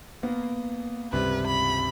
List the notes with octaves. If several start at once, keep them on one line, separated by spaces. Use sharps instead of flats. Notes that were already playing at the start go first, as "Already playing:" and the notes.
A#3 B3
C#2 G2 C3 G3 B4
B5